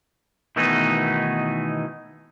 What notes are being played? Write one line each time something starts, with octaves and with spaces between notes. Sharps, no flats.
B2 D#3 E3 A3 B3 D#4